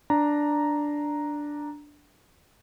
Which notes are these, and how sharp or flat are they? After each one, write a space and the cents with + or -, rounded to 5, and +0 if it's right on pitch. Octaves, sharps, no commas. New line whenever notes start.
D4 +0 A#5 +0